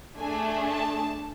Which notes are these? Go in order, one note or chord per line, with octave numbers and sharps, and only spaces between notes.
A3 D4 G#4 G#5
A5